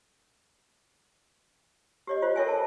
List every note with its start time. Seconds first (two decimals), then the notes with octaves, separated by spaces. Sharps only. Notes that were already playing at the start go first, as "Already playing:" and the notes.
2.07 G4 C#5 D#5
2.22 F4 G4 C5 D#5
2.36 A4 A#4 C#5 E5 G5 G#5
2.48 A5